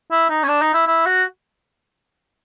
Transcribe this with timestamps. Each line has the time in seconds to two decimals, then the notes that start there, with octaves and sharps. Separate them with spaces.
0.11 E4
0.30 D#4
0.44 C#4
0.48 D4
0.62 D#4
0.74 E4
0.87 E4
1.06 F#4